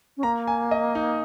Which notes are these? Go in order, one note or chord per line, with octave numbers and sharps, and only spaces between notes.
C#4
A#3 A#5
G#5
D#5
D#4